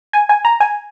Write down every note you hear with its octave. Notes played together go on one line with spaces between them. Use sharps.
G#5
G#5
A#5
G#5